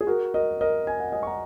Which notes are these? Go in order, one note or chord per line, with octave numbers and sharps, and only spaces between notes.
G#4
F#4 A#4
A#4 D#5
A#4 D#5
G#5
F#5
D#5 G#5
C#6
F#5 A#5